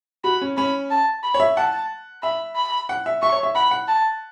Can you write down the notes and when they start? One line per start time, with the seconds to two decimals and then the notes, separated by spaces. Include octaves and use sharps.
0.24 F#4 B5
0.41 C#4
0.57 C#4 B5
0.90 A5
1.24 B5
1.34 C#5
1.40 E5
1.57 F#5 A5
2.23 E5 B5
2.56 B5
2.89 F#5
3.06 E5
3.22 E5 C#6
3.32 C#5
3.43 E5
3.55 F#5 B5
3.71 F#5
3.88 A5